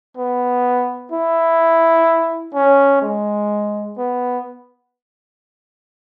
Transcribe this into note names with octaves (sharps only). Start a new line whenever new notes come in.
B3
E4
C#4
G#3
B3